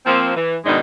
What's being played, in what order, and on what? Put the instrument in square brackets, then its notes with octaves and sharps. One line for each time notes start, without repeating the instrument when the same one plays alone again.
[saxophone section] F3 A#3 C4
E3
G#2 B2 D#3 G#3 D4 D#4